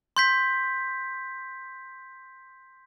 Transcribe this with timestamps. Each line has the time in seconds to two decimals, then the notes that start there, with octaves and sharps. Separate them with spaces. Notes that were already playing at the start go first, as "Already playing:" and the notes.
0.17 C6 G6 B6